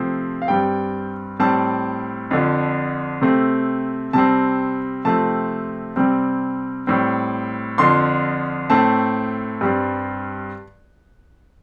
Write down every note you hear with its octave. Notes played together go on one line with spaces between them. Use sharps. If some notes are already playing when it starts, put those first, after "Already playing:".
Already playing: C3 F3 A3 C4
F5
G2 G3 C4 G5
A2 G3 C4 A5
F2 D3 F3
C3 A3 C4
C3 G3 C4 A5
C3 F3 A3 C4 A5
C3 G3 C4
A2 G3 C4
F2 D3 F3 C6
A2 A3 C4 A5
G2 G3 C4